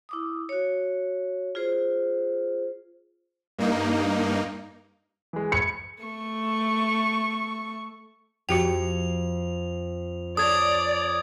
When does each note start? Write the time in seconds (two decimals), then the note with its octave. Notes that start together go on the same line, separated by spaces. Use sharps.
0.09 E4 D6 D#6
0.49 F#4 C#5
1.55 F4 G#4 C5
3.58 G2 A#3 D#4
5.33 E3 G#3
5.52 B5 G#6 C#7
6.03 A3 C#6
8.49 F2 F#4 G4 G5 F7
10.37 A4 C#5 D5 D#6 G#6